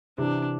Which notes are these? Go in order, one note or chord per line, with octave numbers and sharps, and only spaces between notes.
C3 E3 D4